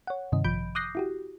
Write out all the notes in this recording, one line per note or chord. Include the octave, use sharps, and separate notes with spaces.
C#5 F#5
G2 C3 D#3 D#5
A1 F3 B5 G6 D7
D6 D#6 F#6 G6 A#6 C7
E4 F#4 G4